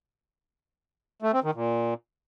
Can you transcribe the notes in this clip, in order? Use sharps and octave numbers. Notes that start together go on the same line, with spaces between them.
A3
C4
D#3
A#2